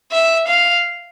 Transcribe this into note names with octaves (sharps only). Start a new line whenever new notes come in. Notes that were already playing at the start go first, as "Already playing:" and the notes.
E5
F5